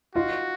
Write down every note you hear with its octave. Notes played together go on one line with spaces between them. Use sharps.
D#4 F4 F#4